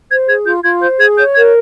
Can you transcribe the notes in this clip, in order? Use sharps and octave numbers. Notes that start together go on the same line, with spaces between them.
C5 G#6
G#4 G#6
F4 G6
F4 G#6
C5 G6
G#4 G#6
C#5 G6
A#4 G#6